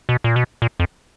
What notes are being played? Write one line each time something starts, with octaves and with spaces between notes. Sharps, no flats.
B2
A#2
B2
A#2
F2